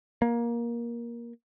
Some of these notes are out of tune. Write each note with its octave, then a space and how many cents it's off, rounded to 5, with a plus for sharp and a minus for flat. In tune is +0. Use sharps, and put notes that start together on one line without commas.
A#3 +15